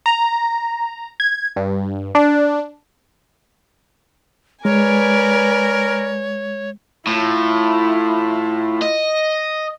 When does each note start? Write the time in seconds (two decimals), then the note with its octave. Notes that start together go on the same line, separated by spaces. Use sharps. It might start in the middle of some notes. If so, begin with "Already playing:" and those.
0.06 A#5
1.20 G#6
1.56 G2
2.15 D4
4.65 G#3 A#4 B4 C#5 D5 G#5
7.07 A2 E4 F4
8.82 D#5